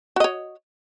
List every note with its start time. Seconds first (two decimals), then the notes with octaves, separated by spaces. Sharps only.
0.16 F#4
0.20 D#5
0.24 C#5